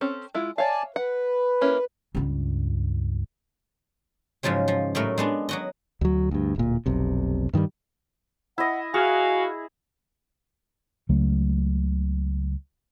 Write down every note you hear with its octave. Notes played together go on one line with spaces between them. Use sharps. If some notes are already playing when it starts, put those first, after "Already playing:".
C4 C#4 A4
G#3 E4 F4
C#5 D5 E5 F5 G#5 A5
B4 F#5
A#3 C#4 E4
C#2 G2
G#2 C#3 F3 F#3 G#3
F3
A2 F#3 G3 A3 A#4
G#3 B3 D4
F#3 F#4 D#5
D2 F#3
D2 G2
D1 A#2
F1 B1 C3
G2 D#3 E3 G3
E4 D#5 F#5
F#4 G#4 F5 G#5
C#2 C#3 F#3 A3